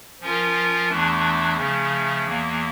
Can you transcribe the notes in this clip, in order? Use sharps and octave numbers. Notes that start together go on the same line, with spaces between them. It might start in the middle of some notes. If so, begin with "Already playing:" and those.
F3 C#4 F4 A#4
E2 E3 A3 D4
C#3 F3 A3 C#4
E2 E3 A#3